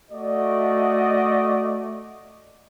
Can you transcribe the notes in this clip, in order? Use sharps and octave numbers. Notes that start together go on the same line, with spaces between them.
A3 F#4 D5 D#5